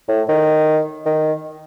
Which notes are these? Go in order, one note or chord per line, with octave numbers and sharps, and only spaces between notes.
A2
D#3
D#3